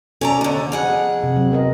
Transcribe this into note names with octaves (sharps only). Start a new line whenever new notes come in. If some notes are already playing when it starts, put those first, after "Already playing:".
C#4 A4 D5 A#5
D#2 D3
F2 G#4 F#5
C3
F#3 C4
B3 A#4 D#5